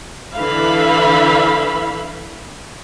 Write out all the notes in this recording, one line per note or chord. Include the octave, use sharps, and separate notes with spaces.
D3 E3 E5 F5 B5